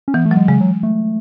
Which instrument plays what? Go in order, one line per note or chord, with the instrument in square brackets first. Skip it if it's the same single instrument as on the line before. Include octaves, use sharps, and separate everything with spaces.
[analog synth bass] C#4
[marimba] E3 [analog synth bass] B3
[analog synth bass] A3
[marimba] F#3
[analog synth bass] G#3
[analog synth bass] C#3 [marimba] G#3
[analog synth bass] F#3
A3